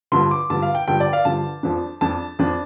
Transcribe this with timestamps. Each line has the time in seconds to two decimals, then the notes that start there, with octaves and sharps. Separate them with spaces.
0.12 G2 D3 F3 C6
0.31 D6
0.50 G2 D3 F3 A5
0.62 F5
0.75 G5
0.88 G2 D3 F3 G5
1.00 D5
1.13 F5
1.25 G2 D3 F3 A5
1.63 F2 F3 D4
2.01 F2 F3 D4 A5
2.39 F2 F3 D4